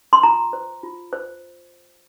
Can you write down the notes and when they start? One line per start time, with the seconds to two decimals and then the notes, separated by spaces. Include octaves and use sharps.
0.13 C6
0.23 F4 A#5
0.53 C5
0.83 F4
1.13 C5